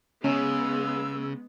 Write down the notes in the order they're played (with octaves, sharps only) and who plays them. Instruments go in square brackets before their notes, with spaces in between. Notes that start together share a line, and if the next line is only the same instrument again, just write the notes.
[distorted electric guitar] C#3 [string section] G#3 B3 [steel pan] C#4 [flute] E6